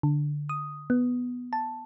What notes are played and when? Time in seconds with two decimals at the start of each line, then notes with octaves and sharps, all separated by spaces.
0.03 D3
0.49 D#6
0.90 B3
1.53 A5